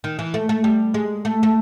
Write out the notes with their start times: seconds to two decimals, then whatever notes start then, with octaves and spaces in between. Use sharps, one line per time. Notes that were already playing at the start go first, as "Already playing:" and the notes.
0.04 D#3
0.19 E3
0.34 A3
0.49 A3
0.64 G3
0.94 G#3
1.25 A3
1.43 A3